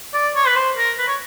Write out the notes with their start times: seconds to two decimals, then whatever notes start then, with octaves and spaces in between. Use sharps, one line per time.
0.14 D5
0.36 C#5
0.47 B4
0.56 C5
0.77 A#4
0.99 B4
1.08 C#5